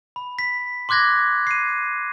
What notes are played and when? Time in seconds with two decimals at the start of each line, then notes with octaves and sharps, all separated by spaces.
0.16 B5
0.39 B6
0.89 C6 D6 F#6 G#6 A#6
1.47 C7 D#7